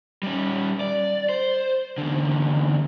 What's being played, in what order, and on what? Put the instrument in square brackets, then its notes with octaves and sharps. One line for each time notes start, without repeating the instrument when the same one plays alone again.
[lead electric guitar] G3 C#4
D5
C5
E2 D3